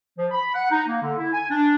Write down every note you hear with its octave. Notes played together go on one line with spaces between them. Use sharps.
F3
B5
F#5
D#4
A#3
D3
E4
G#5
D4